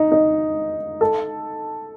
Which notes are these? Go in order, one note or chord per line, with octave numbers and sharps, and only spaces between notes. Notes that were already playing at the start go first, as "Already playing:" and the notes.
Already playing: D#4
D#4
A4